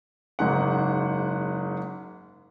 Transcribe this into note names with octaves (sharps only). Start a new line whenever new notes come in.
F#1 G#2 F#5